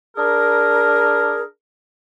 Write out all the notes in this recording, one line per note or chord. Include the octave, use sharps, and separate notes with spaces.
D4 G#4 A#4